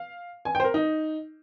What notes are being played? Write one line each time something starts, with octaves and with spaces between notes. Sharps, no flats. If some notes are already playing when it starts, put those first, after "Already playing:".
Already playing: F5
G#5
G5
C5
A#4
D#4